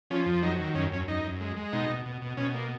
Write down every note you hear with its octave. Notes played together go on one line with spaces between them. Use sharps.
F3 C#4
F2
F#3 D#4
D#3
F#2 C#4
F#2 C#4
F#2 D#4
F#2
G#3
G#3
B2 D#4
B2
B2
B2
B2 C#4
A#3